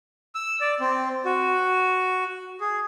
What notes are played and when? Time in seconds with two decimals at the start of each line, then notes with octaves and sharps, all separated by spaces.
0.35 E6
0.61 D5
0.80 C4
1.25 F#4
2.60 G#4